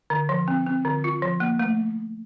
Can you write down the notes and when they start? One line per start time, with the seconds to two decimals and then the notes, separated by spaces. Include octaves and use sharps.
0.10 D3
0.29 F3
0.48 C4
0.66 C4
0.85 D3
1.04 F4
1.22 F3
1.40 A#3
1.59 A3